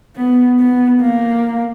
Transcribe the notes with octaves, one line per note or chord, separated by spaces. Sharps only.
B3
B3
A#3